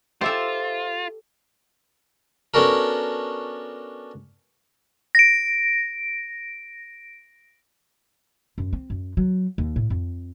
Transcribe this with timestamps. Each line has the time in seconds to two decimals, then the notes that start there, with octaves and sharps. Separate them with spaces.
0.21 F4 G4 A4 C5 E5
2.54 B3 C#4 D4 F#4 A4 A#4
5.15 A#6 D7
8.58 F#2
8.73 C4
8.90 F#2
9.17 F#3
9.58 D#2
9.76 A2
9.90 F2